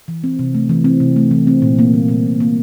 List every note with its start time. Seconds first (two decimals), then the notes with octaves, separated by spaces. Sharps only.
0.08 E3
0.24 C4
0.39 C3
0.54 A3
0.69 E3
0.84 C4
1.00 C3
1.16 A3
1.31 E3
1.47 C4
1.62 A#2
1.79 A#3
1.94 G3
2.09 A#2
2.25 A#2
2.40 A#3